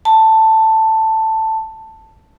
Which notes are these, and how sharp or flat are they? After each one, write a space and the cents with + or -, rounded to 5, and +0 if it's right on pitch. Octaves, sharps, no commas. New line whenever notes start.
A5 +10